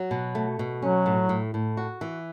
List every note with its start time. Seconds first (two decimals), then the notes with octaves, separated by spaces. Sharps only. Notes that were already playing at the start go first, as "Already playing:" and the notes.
Already playing: F#3
0.11 B2
0.35 A3
0.59 B2
0.82 F#3 C#4
1.06 A2
1.29 A2
1.54 A2
1.77 F#4
2.01 E3